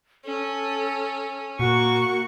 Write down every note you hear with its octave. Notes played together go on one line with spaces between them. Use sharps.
C#4 A4
A#2 A#3 F#4 F#5 C#6